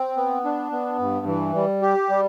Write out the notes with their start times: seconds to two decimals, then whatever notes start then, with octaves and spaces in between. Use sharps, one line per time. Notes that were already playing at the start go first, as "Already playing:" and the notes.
Already playing: C4
0.17 B3
0.45 D4
0.72 B3
0.99 G2
1.27 E3
1.55 G3
1.82 G4
2.10 G3